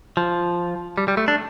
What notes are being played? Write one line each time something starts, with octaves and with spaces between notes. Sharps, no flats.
F3
G3
G3
A3
D4